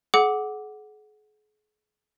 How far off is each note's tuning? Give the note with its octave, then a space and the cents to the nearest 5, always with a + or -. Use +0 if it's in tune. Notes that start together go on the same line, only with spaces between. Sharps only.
G#4 +40 F#5 +0 D6 +0